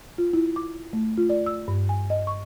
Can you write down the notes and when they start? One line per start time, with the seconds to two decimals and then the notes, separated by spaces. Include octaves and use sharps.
0.18 F4
0.33 E4
0.56 D6
0.93 A3
1.18 F4
1.30 D5
1.46 E6
1.68 G2
1.89 G#5
2.10 D#5
2.27 C#6